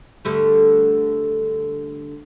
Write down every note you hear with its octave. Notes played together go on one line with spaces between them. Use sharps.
D3 G3 A3